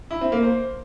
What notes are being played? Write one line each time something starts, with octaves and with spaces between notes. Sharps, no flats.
E4
C4
A#3
C5